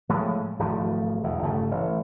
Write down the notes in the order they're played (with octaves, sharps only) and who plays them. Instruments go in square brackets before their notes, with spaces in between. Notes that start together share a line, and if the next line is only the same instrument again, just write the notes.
[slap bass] A2 F3 G#3
D1 G#1 F3 A3
E1 E2
G1 C#3 A3
A1